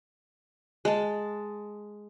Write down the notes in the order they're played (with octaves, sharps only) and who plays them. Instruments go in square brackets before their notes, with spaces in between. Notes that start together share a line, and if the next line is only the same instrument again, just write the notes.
[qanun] G#3 A5